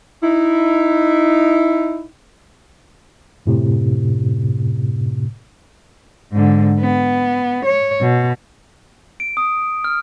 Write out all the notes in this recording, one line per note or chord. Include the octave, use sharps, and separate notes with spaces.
D#4 E4
F#2 A2 C3
G#2 D3
B3
C#5
B2
D7
D#6
F6